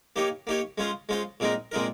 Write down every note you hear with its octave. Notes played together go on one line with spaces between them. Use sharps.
A#3 D#4 G4 C#5
A#3 D#4 G4 C#5
G#3 C#4 F4 C5
G#3 C#4 F4 C5
A#2 G#3 C4 D#4 A#4
A#2 G#3 C4 D#4 A#4